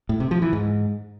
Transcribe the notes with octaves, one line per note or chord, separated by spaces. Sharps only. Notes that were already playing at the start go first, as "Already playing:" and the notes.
A2
C3
F3
E3
G#2